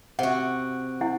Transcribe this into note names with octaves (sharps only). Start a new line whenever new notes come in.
C3 F#4 F#5
E4 F#5 G#5